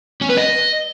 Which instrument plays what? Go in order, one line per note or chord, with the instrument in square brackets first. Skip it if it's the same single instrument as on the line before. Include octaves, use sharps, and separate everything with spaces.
[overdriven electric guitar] C#4
B4
D#5